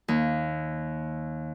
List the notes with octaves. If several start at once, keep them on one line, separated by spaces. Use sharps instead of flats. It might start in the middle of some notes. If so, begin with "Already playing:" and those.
D#2